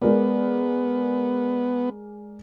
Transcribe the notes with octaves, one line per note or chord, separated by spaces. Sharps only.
G#3 B3 A#4 D5